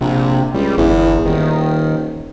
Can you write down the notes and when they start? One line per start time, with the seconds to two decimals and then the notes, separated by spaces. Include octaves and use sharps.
0.01 A#1 C3
0.54 C#2 G3
0.78 G1 E2
1.25 D#1 D#3